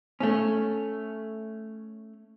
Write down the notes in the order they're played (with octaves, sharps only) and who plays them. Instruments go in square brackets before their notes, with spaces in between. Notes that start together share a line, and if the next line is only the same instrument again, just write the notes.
[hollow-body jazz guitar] A3 C#4